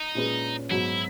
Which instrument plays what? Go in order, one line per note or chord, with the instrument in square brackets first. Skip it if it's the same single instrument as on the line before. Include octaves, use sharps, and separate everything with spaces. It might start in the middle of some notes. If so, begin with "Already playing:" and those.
Already playing: [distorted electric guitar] D#4
[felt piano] A#2 G#3 C#4 G#4 B4
[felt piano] G#2 F#3 B3 F#4 [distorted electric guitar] E4